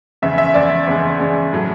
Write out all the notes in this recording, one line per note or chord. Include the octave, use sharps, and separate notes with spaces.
E2 C#3 G#3 E5
E5
E2 C#3 G#3 D5
E2 C#3 G#3
E2 C#3 G#3
A2 F#3 A3